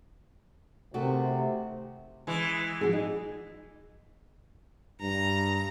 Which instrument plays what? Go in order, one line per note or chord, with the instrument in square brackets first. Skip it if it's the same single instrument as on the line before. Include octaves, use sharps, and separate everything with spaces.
[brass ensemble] C3 [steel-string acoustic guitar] D#3 A3 F#4
[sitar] E3 G#3
[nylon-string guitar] F3 F#4 G#4
D#4
[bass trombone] G2 [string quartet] A#5